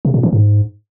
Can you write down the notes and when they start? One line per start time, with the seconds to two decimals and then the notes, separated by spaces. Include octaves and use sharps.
0.05 C3
0.14 A#2
0.23 E3
0.33 G#2